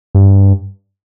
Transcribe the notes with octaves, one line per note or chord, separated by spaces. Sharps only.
G2